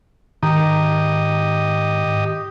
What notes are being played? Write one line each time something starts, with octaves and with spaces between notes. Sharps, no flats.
G#2 D#3 G4 D#5 A#5